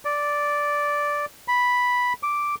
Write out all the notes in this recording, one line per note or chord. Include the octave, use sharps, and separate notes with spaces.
D5
B5
D6